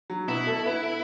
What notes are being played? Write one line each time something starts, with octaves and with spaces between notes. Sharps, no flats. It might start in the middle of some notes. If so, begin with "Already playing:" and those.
F#3
B2 B3 E4
A3 A4
B3 B4